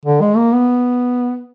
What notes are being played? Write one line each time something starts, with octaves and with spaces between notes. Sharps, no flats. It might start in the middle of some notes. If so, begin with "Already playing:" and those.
D3
G#3
A#3
B3